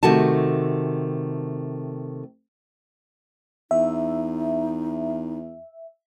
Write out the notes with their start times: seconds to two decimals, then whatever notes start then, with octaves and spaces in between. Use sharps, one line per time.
0.03 C3 D#3 A3 F#4 A5
3.71 E2 D#4 E5